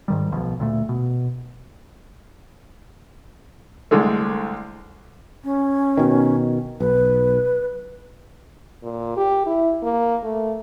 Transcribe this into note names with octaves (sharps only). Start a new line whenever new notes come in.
G#2 D#3 G3
D1 B1 F3
D2 A#2 A3
B2
C2 D3 G#3 A3
C#4
B2 D#3
B1 B4
A#2
G4
E4
A#3
A3